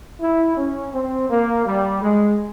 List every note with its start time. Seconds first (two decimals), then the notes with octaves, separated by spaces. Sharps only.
0.21 E4
0.57 C#4
0.94 C4
1.30 A#3
1.66 G3
2.02 G#3